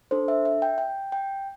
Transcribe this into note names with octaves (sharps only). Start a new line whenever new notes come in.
D4 A4 C5
E5
E5
G5
G5
G5